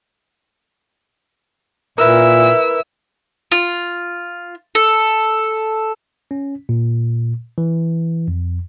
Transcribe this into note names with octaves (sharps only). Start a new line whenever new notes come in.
A#2 E4 A#4 B4 E6
F4
A4
C#4
A#2
E3
F2